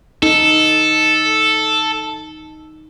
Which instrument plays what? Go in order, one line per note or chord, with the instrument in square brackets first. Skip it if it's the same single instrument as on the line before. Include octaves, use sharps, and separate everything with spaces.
[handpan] D#4 [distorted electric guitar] A4